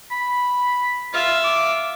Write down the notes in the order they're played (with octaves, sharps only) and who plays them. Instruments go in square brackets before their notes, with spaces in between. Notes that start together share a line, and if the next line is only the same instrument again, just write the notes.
[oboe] B5
[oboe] F4 [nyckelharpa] E5 F5
[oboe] D6